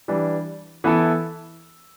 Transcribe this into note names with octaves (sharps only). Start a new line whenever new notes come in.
E3 G3 D4
E3 B3 E4 A4